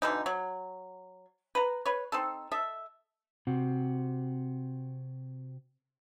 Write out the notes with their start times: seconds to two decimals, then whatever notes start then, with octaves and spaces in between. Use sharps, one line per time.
0.02 B2 D3 E3 D#4
0.26 F#3
1.55 B4 A#5
1.86 B4 C#5
2.12 C4 D#4 A4
2.52 A4 D#5 E5
3.47 C3 C4 F#4